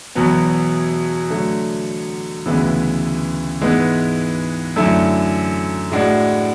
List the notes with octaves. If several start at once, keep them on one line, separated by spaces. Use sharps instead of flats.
E2 B2 F#3 B3
D3 F#3 A3
D2 C#3 E3 G#3 B3
G#2 E3 G#3 B3
F#2 D3 A3 E4
A2 G#3 D4 F#4